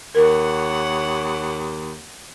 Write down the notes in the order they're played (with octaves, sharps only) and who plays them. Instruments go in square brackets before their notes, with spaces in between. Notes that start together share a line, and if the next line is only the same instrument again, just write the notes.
[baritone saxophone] D#2 [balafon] A#4 [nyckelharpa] C#5 F#5